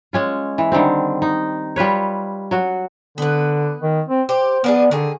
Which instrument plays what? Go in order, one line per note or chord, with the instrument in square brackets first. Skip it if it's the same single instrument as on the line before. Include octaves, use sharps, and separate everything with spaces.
[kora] G#3 C#4 F4
E3
D3 D#3 G3 C4
D#4
G3 F4 B4 C#5
F#3 F#4
[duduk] D3 [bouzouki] B3 B4
[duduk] D#3
C4
[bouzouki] G4 [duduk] C5
[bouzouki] F3 D4 G#4 [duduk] B3
[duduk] D3 [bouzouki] D#3 G#4